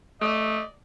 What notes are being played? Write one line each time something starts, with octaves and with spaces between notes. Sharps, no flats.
A3 D5 D#5